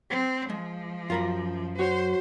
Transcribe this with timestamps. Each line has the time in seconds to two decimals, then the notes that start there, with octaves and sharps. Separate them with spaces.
0.10 C4
0.50 F3 G#3
1.10 F#2 F4 A#4 B5
1.79 F#4 C5 C#5